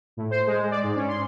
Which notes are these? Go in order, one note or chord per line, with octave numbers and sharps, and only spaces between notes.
A2
C5
G#3
D5
G#2
C#4
C6